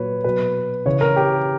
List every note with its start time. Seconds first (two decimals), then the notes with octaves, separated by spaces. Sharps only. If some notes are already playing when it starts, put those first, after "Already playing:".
Already playing: A#2 F#3 B4 C#5
0.24 B2 F#3 B4
0.86 C#3 E3 C#5
1.01 A#4
1.16 G4